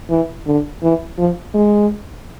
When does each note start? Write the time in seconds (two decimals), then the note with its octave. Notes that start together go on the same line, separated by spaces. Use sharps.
0.10 E3
0.47 D3
0.82 E3
1.19 F3
1.54 G#3